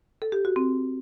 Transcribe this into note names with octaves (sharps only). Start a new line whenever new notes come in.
A4
G4
F#4
C4